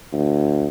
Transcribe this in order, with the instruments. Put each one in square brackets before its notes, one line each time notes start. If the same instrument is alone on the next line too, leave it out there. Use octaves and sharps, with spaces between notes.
[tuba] D2